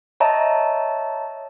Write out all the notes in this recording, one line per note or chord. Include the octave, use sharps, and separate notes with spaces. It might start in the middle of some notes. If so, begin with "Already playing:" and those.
C#5 D#5 E5 A5 A#5